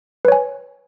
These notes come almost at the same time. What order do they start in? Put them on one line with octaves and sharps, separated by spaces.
B4 C#5 G#5